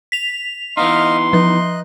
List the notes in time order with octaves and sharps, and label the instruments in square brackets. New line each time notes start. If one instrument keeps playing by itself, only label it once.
[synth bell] B6 F7
[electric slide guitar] E3 B3 D#4 [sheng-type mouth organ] D#5 F5 F6 [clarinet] C6
[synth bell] F3 [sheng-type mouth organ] D#5 F#6